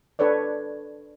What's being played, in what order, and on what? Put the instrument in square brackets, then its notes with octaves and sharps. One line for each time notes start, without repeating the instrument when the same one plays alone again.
[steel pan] D4 A4 B4 C#5 D5